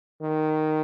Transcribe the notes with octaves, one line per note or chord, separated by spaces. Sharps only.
D#3